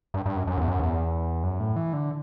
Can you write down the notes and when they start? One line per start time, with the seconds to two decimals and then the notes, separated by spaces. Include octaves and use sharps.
0.14 G2
0.26 G2
0.36 F#2
0.47 F#2
0.58 E2
0.68 F#2
0.80 E2
1.44 F#2
1.60 A2
1.76 E3
1.93 D3